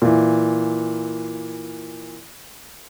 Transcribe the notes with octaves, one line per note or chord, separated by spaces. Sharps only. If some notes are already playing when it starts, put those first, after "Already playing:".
A#2 E3